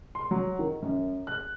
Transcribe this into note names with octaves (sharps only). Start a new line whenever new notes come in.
C6
F#3
D#3
F#2
F#6